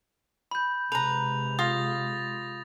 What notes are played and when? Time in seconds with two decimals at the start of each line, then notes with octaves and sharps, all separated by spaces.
0.51 B5 G6
0.92 C3 G#3 B4 A#5 F7
1.59 F4 D#6 A6 A#6